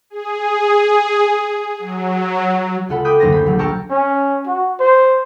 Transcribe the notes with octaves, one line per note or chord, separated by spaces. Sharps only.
G#4
F#3
C#2 F4 A4 F#5 B5
G5 B5 D6 D#6 F#6 G6
F#1 D2 A#3 C5 A6 A#6
B5 G6
A#1 F#3
G5 A5 A#5 C#6 E6 F6
C#4
F#4
C5